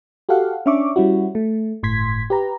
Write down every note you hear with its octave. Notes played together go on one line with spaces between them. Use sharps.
F#4 G4 A4 F5 F#5
C#4 D4 E5 C#6 D6
G3 C#4 E4 F#4
A3
G1 A2 C6 G#6 B6
G4 B4 A#5